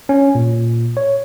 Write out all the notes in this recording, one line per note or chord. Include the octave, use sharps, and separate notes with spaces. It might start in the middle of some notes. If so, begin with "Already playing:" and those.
C#4
A#2
C#5